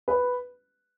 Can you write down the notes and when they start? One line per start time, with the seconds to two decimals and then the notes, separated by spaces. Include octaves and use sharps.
0.08 B4